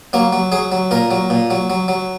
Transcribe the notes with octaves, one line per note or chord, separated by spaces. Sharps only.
F#3 A#3
F#3
F#3 G#4
F#3
A#2 A#4
F#3
A#2
F#3
F#3
F#3